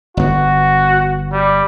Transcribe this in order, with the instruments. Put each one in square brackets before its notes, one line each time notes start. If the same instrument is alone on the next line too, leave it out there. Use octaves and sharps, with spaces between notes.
[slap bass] G1 B3 [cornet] F#4
[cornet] G3